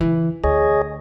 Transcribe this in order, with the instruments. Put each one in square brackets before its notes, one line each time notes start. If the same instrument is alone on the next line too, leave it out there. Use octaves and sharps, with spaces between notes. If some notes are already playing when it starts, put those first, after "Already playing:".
[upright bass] C#3 E3
[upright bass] D2 [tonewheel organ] G#4 C#5 D#5